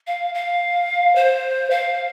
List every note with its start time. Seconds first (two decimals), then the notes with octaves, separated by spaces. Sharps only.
0.07 F5
0.35 F5
1.16 C5
1.71 F5